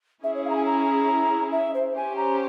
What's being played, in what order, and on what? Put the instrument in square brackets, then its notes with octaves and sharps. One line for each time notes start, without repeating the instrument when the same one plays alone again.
[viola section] C#4 E4 G#4 [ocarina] E5
[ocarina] C#5
F5
A#5
G#5
A#5
E5
C5
[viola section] C#4 G4 C5 [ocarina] G#5
[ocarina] A#5